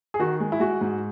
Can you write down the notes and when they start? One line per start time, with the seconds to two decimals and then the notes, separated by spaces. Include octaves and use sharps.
0.14 G#4
0.19 D#3 F#4
0.40 G#3
0.52 E4
0.60 G#3 F#4
0.81 G#2